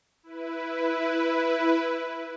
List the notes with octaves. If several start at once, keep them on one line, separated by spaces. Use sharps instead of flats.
E4 B4